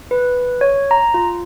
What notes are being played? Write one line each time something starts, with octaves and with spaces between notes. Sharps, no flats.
B4
C#5
A#5
F4